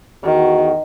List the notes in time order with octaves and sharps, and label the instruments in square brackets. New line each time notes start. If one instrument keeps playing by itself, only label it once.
[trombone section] E2 D#4 F#4 [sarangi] D#3